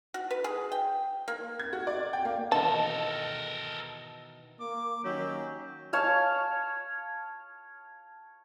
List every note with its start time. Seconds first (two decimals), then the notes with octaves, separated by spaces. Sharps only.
0.14 F#4
0.31 B4
0.44 G#4
0.72 G5
1.28 A#3
1.60 G#6
1.73 F#4
1.87 D5
2.13 G5
2.25 A#3
2.52 B2 D#3 E3 A4 A#4 A5
4.60 A#3 D6
5.04 D#3 F#3 C#4 G4
5.93 C#5 F5 A5